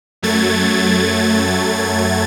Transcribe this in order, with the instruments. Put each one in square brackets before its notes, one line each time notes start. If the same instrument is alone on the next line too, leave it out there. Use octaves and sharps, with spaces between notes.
[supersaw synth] F#2 F#3 A3 G#6 A6